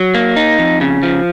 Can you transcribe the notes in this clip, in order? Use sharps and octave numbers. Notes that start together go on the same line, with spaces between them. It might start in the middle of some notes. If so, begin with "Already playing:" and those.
Already playing: F#3
A#3
D#4
F2
C#3
F3